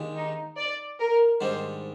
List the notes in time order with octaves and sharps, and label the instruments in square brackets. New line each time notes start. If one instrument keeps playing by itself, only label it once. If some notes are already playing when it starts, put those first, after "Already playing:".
Already playing: [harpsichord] D#2 D#3 G#3 D4 G4
[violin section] D#4
D5
A#4
[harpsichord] G#2 D#3 G3 D4 [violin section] C5